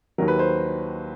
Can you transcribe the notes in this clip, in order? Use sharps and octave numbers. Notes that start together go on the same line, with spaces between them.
D#2 D#3 F#3 A#4
B4
C5